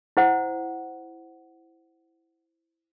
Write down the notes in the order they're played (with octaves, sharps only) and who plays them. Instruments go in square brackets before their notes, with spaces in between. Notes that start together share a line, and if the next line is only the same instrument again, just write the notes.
[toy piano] E4 C5 F#5